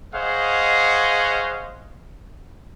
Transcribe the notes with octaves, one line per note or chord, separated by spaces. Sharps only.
G#4 C5 C#5 D#5 F5 F#5